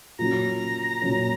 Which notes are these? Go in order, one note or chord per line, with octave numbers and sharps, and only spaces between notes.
A#2 F#3 C#4 A#5
A#2 F#3 C#4